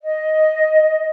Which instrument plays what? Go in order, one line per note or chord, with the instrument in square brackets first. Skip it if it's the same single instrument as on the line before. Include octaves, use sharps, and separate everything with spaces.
[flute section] D#5